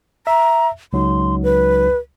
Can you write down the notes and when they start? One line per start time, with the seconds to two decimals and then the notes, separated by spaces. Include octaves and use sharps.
0.27 E5 A#5
0.93 C#2 F#3 D#4 C6
1.43 B4